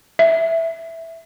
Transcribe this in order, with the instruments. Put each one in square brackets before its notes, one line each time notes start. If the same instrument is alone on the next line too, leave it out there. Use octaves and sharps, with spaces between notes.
[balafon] E5